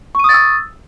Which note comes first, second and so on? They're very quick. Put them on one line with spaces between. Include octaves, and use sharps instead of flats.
C#6 D#7 D#6 A6 E6